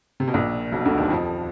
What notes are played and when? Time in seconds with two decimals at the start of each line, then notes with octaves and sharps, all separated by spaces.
0.20 C3
0.28 B2
0.34 A#1 A#2
0.72 B1 B2
0.85 D2 D3
0.98 D#2 D#3
1.10 F2 F3